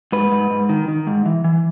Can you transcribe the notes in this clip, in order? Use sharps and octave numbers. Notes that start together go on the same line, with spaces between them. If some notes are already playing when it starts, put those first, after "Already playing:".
G#2 B4
G#2
G#2
D#3
D#3
G#2
E3
E3